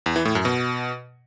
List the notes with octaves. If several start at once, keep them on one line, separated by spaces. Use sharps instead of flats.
E2
E3
A2
F#2
B2